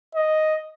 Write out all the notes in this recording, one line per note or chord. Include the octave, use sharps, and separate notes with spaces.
D#5